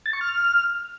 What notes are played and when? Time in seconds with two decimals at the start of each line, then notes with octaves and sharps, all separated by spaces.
0.06 A6
0.13 C#6
0.21 F6